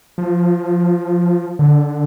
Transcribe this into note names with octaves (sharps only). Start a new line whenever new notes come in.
F3
D3